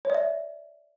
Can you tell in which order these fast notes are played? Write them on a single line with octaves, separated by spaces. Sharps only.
C#5 D5 E5